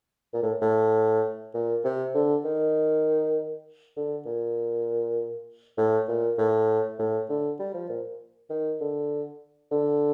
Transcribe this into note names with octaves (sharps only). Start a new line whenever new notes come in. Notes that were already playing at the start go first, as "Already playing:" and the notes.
A#2
A2
A2
A#2
C3
D3
D#3
D3
A#2
A2
A#2
A2
A2
D3
G3
F3
A#2
D#3
D3
D3